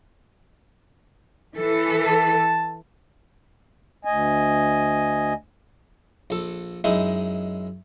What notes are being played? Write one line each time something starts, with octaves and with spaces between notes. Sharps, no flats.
E3 A4 B4
A5
D2 D#5 G#5
A#1 A4
F#2 G#3 D#4 E4